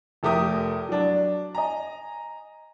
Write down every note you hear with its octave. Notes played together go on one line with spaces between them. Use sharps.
F1 A3 G4 A#4 D#6
F#3 D4
D#5 G#5 A#5